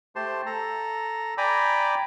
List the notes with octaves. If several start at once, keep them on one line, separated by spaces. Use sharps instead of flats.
A3 G4 C5 A5 C6
A4 A#5
D5 G5 G#5 A#5 B5 D6